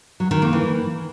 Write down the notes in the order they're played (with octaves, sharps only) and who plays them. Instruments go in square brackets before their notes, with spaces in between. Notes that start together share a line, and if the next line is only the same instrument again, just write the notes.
[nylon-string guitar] F#3
D#3
A#3
E3